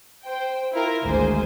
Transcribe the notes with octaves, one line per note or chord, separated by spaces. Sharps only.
C5 G5
E4 F4 A#4
G#1 D2 G#3 A#3 C5 G#5